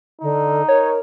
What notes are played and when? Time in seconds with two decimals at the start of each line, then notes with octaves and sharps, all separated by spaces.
0.21 D3 D#4
0.68 A#4 C#5